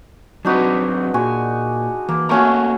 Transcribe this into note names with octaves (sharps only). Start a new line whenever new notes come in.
F#3 C4 D4 D#4 F#4 B4
A#2 G#3 F#4 G#5
E3 A#3
A3 A#3 C#4 F#4 A4 A#5